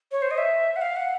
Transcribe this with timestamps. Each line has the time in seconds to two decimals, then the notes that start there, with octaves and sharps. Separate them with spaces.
0.12 C#5
0.22 C5
0.31 D#5
0.38 E5
0.76 F#5
0.81 F5
0.96 F#5